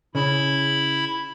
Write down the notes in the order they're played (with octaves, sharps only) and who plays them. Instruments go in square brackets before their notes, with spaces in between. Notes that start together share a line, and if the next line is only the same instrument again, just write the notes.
[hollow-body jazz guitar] C#3 [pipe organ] E4 B5